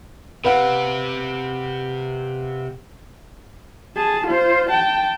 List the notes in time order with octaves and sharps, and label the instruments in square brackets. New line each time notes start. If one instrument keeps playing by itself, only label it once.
[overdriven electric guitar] C3 C4 [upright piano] B4 F5 F#5
[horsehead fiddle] G#4 A5
F4 C5
G5 A5